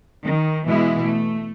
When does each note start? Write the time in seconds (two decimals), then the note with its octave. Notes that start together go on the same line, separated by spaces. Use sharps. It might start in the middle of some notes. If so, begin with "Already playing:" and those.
0.24 D#3
0.68 B2 E3 G#3 B3 E4
1.04 A3